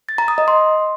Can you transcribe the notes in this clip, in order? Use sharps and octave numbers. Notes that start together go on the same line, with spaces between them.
A6
A#5
D#6
D#5
C6